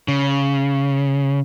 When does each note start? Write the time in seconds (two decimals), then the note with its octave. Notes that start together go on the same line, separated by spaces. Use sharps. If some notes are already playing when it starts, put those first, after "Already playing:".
0.08 C#3